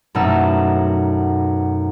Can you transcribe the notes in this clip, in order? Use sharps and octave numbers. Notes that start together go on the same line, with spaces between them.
F#2 B2 A3 D#4 E6